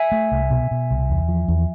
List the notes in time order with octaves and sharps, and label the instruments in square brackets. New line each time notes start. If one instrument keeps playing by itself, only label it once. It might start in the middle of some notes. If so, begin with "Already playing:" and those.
Already playing: [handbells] E5 G#5
[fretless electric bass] A3
C2
B2
B2
C2
E2
F3
E2